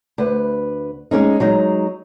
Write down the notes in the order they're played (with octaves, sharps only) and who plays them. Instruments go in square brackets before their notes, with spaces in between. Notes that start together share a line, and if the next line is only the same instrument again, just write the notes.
[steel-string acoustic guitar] D2 B4
G#3 A#3 C#4 D#4
F#3 G#3 D#4